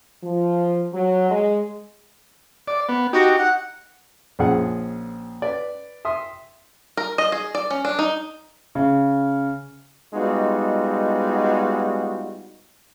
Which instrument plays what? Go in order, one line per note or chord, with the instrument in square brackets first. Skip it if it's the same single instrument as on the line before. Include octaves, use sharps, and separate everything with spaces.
[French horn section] F3
F#3
G#3
[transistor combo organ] D5
B3
[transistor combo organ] D#4 G4 [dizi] F#4
[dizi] F#5
[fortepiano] A#1 F3 C#4 G#4 F#5
B4 D5
E5 C6 D#6
[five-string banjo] A#4
D#5
G#4
D5
C#4
D4
D#4
[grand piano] C#3
[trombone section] G3 G#3 B3 D#4 F4 F#4